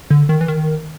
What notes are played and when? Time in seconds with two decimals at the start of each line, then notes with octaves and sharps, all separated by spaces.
0.10 D3
0.29 D#3
0.41 E3
0.48 D#3